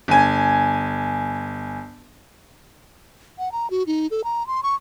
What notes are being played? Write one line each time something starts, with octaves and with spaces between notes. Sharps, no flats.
G1 G#5
F#5
A#5
F#4
D#4
A4
A#5
C6
C#6